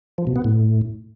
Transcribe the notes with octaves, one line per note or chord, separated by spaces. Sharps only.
F3
B2
B3
A2